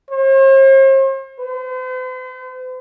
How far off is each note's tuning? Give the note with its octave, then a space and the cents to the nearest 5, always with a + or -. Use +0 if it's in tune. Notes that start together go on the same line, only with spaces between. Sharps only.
C5 +45
C5 -45